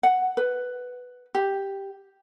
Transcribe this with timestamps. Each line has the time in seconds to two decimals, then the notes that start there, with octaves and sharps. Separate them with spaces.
0.03 F#5
0.37 B4
1.35 G4